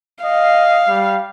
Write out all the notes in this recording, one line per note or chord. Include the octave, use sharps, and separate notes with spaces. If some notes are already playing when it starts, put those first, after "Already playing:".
D#5 F5
G3